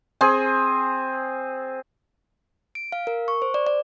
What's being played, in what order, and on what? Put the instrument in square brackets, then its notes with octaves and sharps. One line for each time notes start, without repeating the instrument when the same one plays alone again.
[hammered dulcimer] C4 G#4 G#5
[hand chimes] D7
F5
A#4
C#6
C5
D5
D5